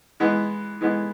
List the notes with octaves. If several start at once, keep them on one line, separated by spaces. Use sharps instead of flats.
E3 G#3 B3
E3 G#3 B3